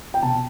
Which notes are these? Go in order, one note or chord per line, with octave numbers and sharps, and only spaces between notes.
G5
B2 A5